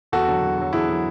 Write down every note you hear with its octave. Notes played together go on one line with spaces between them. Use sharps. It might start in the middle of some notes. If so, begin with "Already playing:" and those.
E2 F#4 A4
D3 F#3
E2
D3 F#3
E2 E4 G#4
D3 F#3